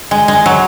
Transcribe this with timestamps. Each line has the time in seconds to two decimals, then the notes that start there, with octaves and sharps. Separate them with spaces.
0.11 G#3
0.28 G#3
0.46 F#3